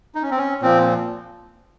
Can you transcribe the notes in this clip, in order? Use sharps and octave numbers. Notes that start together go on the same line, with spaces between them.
D#4
C#4
C4
C#4
A#2 F3 C4